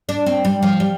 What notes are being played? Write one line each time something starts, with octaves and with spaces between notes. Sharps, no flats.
D4
C4
G3
F3
G3